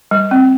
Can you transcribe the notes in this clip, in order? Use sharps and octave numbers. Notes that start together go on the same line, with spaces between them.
G3
C4